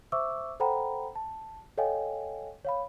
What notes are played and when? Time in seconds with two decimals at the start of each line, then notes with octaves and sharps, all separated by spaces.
0.12 C5 E5 C#6 D6 E6
0.60 A4 C5 F#5 G5 A#5 B5
1.15 A5
1.78 A4 C#5 D#5 F5 G5 G#5
2.65 C#5 F5 B5